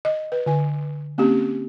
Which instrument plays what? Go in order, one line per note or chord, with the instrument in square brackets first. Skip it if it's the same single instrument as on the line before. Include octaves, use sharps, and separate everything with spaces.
[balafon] D#5
B4
D3 G#5
A#3 C4 C#4 G4